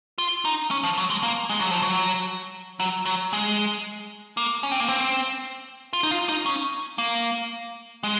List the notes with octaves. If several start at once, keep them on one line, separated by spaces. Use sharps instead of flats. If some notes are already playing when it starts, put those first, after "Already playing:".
F4
D#4
C#4
F3
F#3
G#3
A#3
G#3
F#3
F3
F#3
F#3
F#3
G#3
A#3
C#4
C4
A#3
C4
F4
D#4
F4
D#4
C#4
A#3
G#3